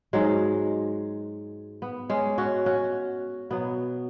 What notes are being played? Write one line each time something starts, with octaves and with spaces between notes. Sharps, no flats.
G#2 F#3 G#3
B3
G#3 C#4
C#4 F#4
C#4 F#4
B2 F#3 B3